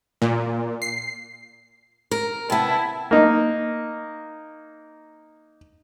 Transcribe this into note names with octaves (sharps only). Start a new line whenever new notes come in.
A#2
C7
A#4
C3 B3 E4 A5
A#3 D#4